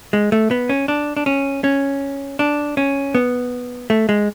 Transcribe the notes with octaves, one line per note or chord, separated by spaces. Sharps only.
G#3
A3
B3
C#4
D4
D4
C#4
C#4
D4
C#4
B3
A3
G#3